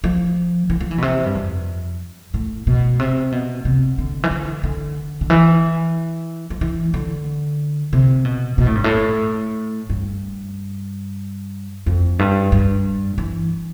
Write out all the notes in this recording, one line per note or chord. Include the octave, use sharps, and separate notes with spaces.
F3
E3
F3
E3
B2
C3
G2
F2
A2
B2
C3
B2
C3
D3
E3
D3
D3
D3
E3
F3
E3
D3
C3
B2
B2
A2
G2
A2
G2
F2
G2
G2
E3